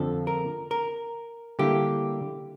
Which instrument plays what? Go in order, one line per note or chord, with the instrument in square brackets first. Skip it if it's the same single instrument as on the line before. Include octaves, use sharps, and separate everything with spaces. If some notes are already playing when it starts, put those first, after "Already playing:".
Already playing: [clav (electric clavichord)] F2 D3 F3 [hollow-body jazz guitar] A4
[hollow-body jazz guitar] A#4
A#4
[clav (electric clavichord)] D3 G3 A#3 E4 [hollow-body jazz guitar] G4